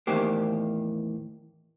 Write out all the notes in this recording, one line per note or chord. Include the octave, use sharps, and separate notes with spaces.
E2 A2 D#3 A#3 G4 C5